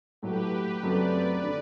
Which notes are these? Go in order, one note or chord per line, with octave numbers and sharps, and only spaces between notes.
A2 F#3 A3 G4 B4
F#1 F#2 F#3 A3 C4 B4 D5
D3